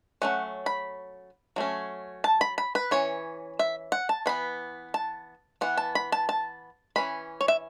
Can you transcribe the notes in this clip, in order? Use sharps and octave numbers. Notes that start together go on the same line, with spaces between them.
F#3 A3 C#4 F#5
B5
F#3 A3 C#4
A5
B5
B5
B4
E3 C#4 C#5
E5
F#5
A5
E3 B3 B5
A5
E3 B3 F#5
A5
B5
A5
A5
E3 C#4 B5
C#5
E5